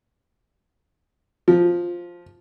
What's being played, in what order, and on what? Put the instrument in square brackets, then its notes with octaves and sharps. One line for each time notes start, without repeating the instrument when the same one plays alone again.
[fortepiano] F3